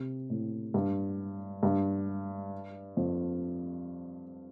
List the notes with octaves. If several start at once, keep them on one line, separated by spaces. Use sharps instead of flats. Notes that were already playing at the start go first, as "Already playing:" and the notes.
Already playing: C3
A2
G2
G2
F2